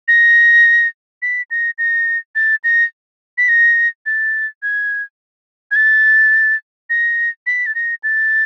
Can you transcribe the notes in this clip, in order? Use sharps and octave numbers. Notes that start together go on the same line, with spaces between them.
A#6
B6
A#6
A#6
A6
A#6
B6
A#6
A6
G#6
G#6
A6
A#6
B6
A6
A#6
A6